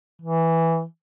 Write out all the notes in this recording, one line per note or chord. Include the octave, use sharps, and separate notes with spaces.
E3